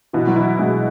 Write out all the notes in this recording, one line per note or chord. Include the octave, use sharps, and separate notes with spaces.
B2 E3
F#3
E3 E4
B2 G#3